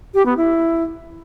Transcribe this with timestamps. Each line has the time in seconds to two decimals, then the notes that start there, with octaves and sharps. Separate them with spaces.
0.14 G4
0.26 B3
0.37 E4